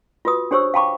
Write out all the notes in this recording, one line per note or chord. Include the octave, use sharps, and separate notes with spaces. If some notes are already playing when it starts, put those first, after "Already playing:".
F4 F#4 B4 D#6
D4 G4 C5 C#5 C#6 E6
F5 G5 A5 B5 C#6 D6